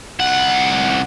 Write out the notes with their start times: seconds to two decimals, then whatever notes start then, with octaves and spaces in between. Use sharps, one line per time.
0.20 C2 F#5